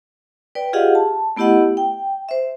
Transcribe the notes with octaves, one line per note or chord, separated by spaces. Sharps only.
B4 D5 G5
F4 G4 G#4 D#5 F5 F#5
A5
A3 B3 E4 G4 D#5 F#5
G5
C5 E5